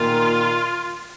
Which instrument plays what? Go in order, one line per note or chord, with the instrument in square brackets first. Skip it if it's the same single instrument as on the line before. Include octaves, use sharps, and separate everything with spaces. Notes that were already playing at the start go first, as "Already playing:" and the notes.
Already playing: [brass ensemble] A#2 D#3 [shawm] F4